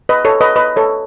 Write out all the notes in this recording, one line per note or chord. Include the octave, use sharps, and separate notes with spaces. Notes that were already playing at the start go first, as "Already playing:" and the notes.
B4 D#5
A4 C#5
B4 D#5
B4 D#5
A4 C#5